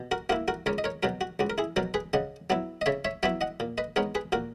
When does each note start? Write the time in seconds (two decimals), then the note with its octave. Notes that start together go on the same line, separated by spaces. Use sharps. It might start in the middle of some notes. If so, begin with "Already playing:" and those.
Already playing: B2
0.11 F#4 A#4
0.30 A#3 E4 F#4 A#4
0.48 F#4 A#4
0.66 C#2 A#4 C#5
0.78 D#5
0.84 A#4 C#5
1.03 B2 F#3 F#4 A#4
1.21 F#4
1.39 C#2 F#4
1.50 A#4
1.58 E4 G#4
1.76 B2 F#3 F#4 A#4
1.94 G#4 B4
2.14 C#3 D#5 F#5
2.50 F#3 B3 E4
2.81 D#5
2.86 C#3 C#5 E5
3.05 C#5 E5
3.23 F#3 B3 E4 C#5 E5
3.41 D#5 F#5
3.60 A#2
3.78 B4 D#5
3.96 G#3 B3 D#4 A#4 C#5
4.15 G#4 B4
4.32 A#2 F#4 A#4